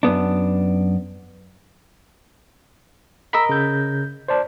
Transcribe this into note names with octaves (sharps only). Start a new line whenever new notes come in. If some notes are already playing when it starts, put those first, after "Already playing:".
F#2 B3 D4
A#4 D#5 B5 E6 B6
C#3 G6
C5 D5 A5